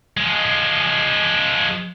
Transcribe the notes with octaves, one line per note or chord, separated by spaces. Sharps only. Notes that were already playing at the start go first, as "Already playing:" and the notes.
F3 G#3